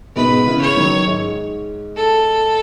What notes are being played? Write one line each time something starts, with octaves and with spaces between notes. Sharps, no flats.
G#2 B2 B4
C#3 E3
C#5
D#3 F#3
G#2
A4